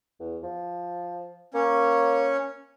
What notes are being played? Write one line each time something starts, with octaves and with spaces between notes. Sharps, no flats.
E2
F3
A#3 C#4 C#5